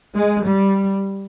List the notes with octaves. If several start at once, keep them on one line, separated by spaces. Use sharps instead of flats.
G#3
G3